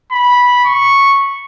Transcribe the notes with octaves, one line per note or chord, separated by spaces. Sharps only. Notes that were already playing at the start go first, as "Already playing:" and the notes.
B5
C#6